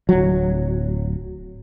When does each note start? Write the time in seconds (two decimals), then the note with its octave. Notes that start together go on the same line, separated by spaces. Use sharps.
0.09 D1 F#3